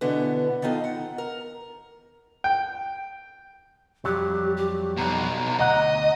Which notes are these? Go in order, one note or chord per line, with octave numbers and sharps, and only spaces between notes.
B2 D3 E3 B3
D#3 B3 D#4 F4 A4
F#5
A#4
G5
F2 F#3 G3 G4
G4
B1 B2 A#5
D2 D#5 F#5